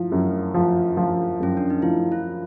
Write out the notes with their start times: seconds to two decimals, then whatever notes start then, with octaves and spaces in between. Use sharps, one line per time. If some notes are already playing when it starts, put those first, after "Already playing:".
Already playing: F3 E4
0.12 F#2
0.54 F3
0.97 F3
1.40 F#2 C#4
1.57 D4
1.70 D#4
1.82 F3 E4
2.12 F4